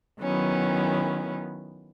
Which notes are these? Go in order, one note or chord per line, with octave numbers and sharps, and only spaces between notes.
D#3 F#3 B3 C#4 E4